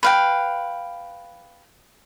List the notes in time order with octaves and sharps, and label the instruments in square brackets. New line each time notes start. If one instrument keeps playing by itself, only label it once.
[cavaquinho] B4 F5 G5